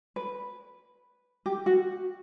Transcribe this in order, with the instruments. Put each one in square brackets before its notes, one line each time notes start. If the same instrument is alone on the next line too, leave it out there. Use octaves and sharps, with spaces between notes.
[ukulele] B4
G4
F#4